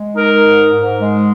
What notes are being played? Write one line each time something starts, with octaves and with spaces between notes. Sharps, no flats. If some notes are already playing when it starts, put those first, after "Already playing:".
Already playing: G#3
D#4 A#4
G#2
G#2
G#3